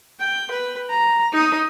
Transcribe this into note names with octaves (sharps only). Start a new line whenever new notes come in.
G5
B4
A#5
D#4 D#6